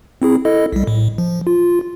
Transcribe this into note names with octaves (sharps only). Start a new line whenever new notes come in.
C4 E4 G#4
E4 A4 D#5
B1 G3
A2
F3
F4